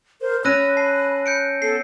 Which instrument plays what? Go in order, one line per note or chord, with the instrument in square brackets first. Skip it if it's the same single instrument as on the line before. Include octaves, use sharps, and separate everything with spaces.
[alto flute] A#4 [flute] C5
[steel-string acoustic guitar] C#4 [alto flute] B5 [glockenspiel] E6 A#6 D#7 [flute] F#6
[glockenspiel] A5 C7
G6 C#7 D7
[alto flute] B3 [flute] A4 [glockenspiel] C7